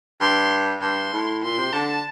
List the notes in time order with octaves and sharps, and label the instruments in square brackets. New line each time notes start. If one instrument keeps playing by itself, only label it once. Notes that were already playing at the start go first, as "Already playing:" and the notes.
[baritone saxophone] G2 [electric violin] C6
[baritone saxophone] G2 [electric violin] C6
[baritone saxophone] A2
[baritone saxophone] A#2 [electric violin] C6
[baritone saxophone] C3
[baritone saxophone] D3 [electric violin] A5